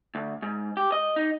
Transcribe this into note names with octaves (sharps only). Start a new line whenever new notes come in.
D2
G#2
G4
D#5
D#4